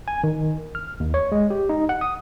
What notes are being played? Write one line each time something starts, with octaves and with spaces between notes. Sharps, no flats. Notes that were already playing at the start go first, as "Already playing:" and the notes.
G#5
D#3
F6
D#2
C#5
G#3
G4
D#4
F#5
D#6